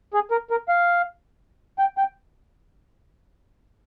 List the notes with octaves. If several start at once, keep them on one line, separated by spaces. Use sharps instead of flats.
G#4
A#4
A#4
F5
G5
G5